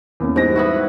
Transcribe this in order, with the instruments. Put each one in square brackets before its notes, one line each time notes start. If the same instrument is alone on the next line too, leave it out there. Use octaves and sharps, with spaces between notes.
[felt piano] E2 A#3 C#4
[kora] G#2 [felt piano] G3 A#6
[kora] B3 E4 F#4